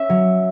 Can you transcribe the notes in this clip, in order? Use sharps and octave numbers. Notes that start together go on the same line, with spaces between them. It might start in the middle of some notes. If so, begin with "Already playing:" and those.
Already playing: C#4 E5
F#3